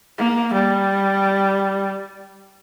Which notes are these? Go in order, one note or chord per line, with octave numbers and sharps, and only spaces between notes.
A#3
G3